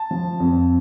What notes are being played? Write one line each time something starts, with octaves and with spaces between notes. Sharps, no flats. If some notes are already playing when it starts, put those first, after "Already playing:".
Already playing: A5
F3
F2